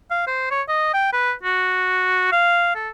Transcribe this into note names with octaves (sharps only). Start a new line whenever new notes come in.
F5
C5
C#5
D#5
G5
B4
F#4
F5
A4